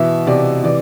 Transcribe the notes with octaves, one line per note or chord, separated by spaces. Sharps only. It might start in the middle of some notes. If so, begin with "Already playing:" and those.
Already playing: B2 E3 E5
C3 D5
E3 D5